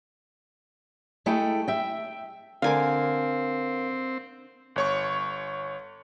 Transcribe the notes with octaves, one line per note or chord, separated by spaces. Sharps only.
G#3 A3 E4 G#4 A4 G5
E5 G5
D3 C4 A#4 F5 G#5 D6
G1 C#5 C#6